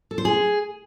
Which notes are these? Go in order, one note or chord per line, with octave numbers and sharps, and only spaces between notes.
A4
C5
G#4